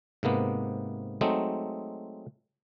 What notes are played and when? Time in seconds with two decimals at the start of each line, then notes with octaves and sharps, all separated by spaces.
0.23 G#2 C3 A#3 B3
1.21 F#3 G#3 A3 C4 D#4